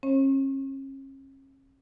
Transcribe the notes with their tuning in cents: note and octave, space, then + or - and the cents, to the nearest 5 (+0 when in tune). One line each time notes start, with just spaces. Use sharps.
C#4 -40 C#5 -45